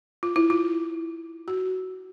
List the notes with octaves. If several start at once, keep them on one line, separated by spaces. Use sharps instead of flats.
F4
E4
F4
F#4